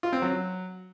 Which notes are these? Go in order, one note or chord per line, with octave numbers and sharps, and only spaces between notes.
F4
C4
F#3